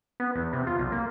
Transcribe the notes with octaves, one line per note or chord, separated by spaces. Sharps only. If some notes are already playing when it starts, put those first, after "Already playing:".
B3
E2
C3
F4
B1
A#3